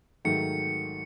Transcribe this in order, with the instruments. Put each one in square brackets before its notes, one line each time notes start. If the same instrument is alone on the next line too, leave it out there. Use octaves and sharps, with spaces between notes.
[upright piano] G#2 D#3 F#3 A3 [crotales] C#7